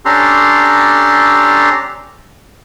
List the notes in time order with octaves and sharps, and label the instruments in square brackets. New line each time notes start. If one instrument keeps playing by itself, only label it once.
[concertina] C#4 D4 G4 A4 A#5 C6